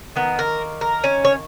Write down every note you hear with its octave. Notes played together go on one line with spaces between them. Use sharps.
D#3 A#3 B3
A#4
A#4
C#4
C#5